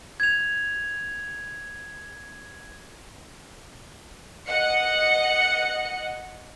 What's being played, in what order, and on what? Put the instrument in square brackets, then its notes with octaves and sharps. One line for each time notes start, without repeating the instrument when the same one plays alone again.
[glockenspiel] G#6 F7
[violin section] D#5 F#5 C#7